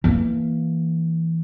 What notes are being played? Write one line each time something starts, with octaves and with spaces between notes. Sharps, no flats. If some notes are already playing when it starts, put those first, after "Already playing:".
E3 A#3